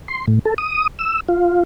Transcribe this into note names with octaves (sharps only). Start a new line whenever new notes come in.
C6
A2
A4
D#6
E6
F4